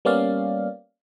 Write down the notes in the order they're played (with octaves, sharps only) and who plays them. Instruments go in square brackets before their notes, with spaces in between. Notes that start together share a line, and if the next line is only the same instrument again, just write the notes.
[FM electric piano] G3 A#3 B3 C#4 D5 F5